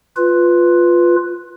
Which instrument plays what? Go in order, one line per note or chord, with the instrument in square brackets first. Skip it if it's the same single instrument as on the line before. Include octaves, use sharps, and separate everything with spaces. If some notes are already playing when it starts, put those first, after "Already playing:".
[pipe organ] F4 B4